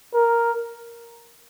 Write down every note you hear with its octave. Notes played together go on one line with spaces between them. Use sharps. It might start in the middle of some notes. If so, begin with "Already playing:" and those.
A#4